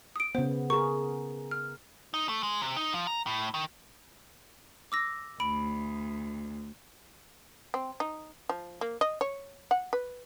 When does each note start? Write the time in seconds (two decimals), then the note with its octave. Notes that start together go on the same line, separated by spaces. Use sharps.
0.16 D#6 D7
0.35 C#3 B3 C5
0.70 G#4 A#4 C#6
1.51 F6
2.14 D#4
2.29 A3
2.43 G#3
2.62 C3
2.77 D#4
2.94 F3
3.07 A#5
3.27 A2
3.54 D#3
4.92 D6 E6 A#6
5.40 D2 B5 D7
7.74 C4
8.00 D#4
8.49 F3
8.81 A#3
9.01 D#5
9.21 C#5
9.71 F#5
9.93 B4